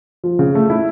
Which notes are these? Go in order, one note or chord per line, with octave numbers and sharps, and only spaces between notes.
F3
C#3
A3
E4